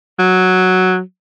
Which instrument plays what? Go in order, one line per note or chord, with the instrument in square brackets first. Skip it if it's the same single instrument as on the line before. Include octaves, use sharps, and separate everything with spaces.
[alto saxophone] F#3